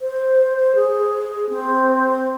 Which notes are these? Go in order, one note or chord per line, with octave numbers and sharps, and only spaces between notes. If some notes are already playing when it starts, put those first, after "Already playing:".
C5
G#4
C4